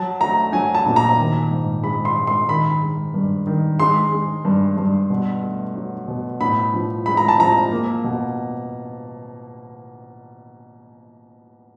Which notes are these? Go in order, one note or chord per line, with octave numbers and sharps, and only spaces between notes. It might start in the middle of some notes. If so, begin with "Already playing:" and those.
Already playing: F#3 A5
A3 A#5
F#3 G#5
A5
A#2
A#5
D#3
G#2
G#3 B5
C6
G#2
C6
D#3 B5
G#3
G2
D#3
G#3 C6
G#3
G2
G2
B2
A3
F#3
B2
A2 B5
F3
G#3 B5
A#5
A5
F3 A#5
A#3
B2